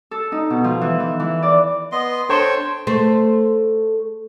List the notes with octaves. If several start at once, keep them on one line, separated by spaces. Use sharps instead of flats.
A4
D#4
B2
F3
E3
E3
E3
D5
B3 D#5 C6
D4 A4 C5 C#5 G5
A3 C5